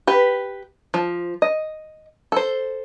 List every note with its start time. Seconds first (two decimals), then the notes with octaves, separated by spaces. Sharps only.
0.07 G4 B4
0.94 F3
1.42 D#5
2.32 A4 C5